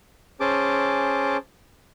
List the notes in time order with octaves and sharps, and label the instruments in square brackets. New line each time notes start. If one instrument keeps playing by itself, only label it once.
[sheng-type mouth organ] C#4 G#4 C5 A5 D6